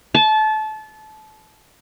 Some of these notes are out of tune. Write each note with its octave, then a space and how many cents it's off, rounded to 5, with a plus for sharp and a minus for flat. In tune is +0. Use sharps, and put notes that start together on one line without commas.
A5 -25